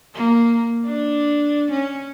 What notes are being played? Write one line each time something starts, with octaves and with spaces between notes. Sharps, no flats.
A#3
D4
C#4